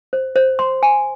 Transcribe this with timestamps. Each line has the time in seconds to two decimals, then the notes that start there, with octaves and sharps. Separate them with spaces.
0.13 C5
0.36 C5
0.59 C6
0.83 G#5